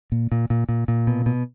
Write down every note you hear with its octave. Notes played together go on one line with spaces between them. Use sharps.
A#2
A#2
A#2
A#2
A#2
B2
B2